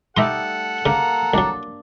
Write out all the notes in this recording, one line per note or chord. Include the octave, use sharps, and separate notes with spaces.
G3 A3 D#4 A4 E5 F#5 A#5 C6
C#3 A#3 A#5
C2 F#3 D4